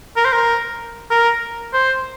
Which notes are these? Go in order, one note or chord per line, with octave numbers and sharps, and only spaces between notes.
A#4
C5
A#4
A#4
C5